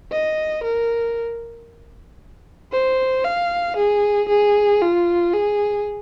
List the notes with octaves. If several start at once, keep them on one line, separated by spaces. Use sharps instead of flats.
D#5
A#4
C5
F5
G#4
G#4
F4
G#4